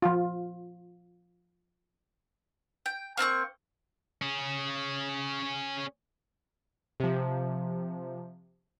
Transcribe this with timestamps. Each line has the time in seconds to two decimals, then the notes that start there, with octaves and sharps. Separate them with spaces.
0.02 F3 F4
2.86 G5
3.17 A#3 C4 A#5 C#6
4.22 C#4 G#4
7.00 C3 F3